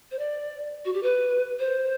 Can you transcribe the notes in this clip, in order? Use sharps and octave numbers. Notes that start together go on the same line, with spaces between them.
C5
D5
F#4
G4
B4
C5